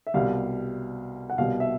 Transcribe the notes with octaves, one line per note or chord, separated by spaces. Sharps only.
E5
C2 B2 G3 F5
F#5
C2 B2 G3 F5
E5